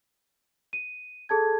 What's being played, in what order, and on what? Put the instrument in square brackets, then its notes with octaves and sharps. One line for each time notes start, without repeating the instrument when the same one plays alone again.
[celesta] D#7
G#4 A4 A5 G#6